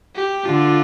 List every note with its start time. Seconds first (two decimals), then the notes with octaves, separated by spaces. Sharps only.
0.15 G4
0.45 D3 F4